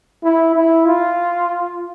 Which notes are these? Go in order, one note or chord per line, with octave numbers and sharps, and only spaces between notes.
E4
E4
F4